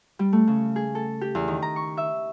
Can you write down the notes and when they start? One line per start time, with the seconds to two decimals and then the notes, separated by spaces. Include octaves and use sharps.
0.19 G3
0.33 A3
0.47 C#3
0.76 G#4
0.95 A4
1.21 G4
1.35 E2
1.48 D#3
1.62 A#5
1.76 C#6
1.97 E5